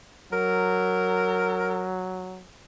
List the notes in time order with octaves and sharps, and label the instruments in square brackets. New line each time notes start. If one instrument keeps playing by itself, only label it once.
[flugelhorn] F#3 [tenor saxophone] A#4